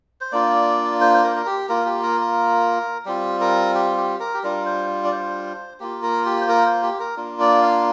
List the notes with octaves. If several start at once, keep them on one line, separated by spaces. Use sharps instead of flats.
C5
A#3 D4 F4 D5
C5
C5
A#4
A#4
G4
A#3 F4 A#4
G4
A#4
A#4
G3 C4 F4 G4
A#4
G4
G4
A#4
G4
G3 D4 F4 A#4
C5
D5
C5
A#3 F4 G4
A#4
G4
C5
A#4
C5
G4
A#4
A#3 D4 F4
D5
F5